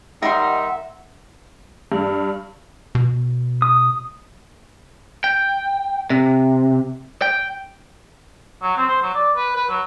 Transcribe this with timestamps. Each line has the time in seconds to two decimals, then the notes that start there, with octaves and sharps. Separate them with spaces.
0.22 D#3 G3 D#4 A#4 E5 F#5 C6
1.92 G2
2.95 B2
3.62 D#6
5.24 G5
6.10 C3
7.22 G5
8.62 F#3
8.76 C4
8.88 C5
9.02 F#3
9.14 D5
9.36 B4
9.56 B4
9.69 F#3